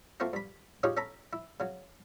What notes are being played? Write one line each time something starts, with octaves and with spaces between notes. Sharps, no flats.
A3 A#3 C4 F4 F#4
G2 B5
C#4 D#4 F4 G4 G#4 C#5
C#4 A4 A#5 B5
E4
C#3 F#3